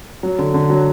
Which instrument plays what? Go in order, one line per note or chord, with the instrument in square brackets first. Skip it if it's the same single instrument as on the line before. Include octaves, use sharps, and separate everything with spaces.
[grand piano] F#3
D3
D3
F#3